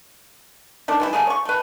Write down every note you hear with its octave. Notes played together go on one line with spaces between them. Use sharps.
D#3 A3 D4
E3 G3 E4
G3 A3 A#3 G#4
C#5 C#6
A3 B4